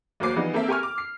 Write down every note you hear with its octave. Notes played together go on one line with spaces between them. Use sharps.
E2 F#3 A#3 C5 D6 C7
E3 F3 G3 B3 D#4
A#3 C4 A4 A#4 E5
G4 A#4 G#5 C#6 F6
D6
C7